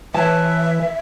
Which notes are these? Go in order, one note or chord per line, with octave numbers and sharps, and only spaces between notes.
E3 B4 C#5 E5 A5